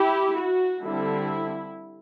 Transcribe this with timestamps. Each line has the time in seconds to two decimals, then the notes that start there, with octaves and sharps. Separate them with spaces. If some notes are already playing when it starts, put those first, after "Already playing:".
Already playing: E4 G4
0.37 F#4
0.83 D3 G3 C4 E4